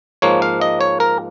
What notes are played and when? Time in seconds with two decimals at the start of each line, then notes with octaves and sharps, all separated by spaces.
0.22 G#2 F3 A#3 C#5
0.42 F5
0.61 D#5
0.81 C#5
1.00 A#4